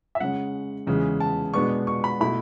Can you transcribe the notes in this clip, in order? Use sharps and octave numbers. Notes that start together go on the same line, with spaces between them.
E5
C#3 G#3 C#4 F#5
E2 C#3 E3 G#3
A5
B2 G#3 B3 D4 C#6
C#6
B5
B2 A3 E4 B5